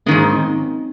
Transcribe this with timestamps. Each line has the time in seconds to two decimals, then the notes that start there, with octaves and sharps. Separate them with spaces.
0.06 G#2 D#3 G#3 A#3 C#4
0.33 C4 D#4